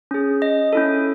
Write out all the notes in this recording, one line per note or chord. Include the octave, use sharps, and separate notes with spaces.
C#4 G#4
D#5
C#4 E4 A4